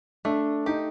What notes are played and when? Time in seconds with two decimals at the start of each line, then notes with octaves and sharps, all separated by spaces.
0.25 A3 D4
0.66 D#4 G4